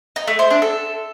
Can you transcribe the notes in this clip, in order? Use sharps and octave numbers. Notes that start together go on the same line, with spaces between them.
D#4
A3
C5
D4
A4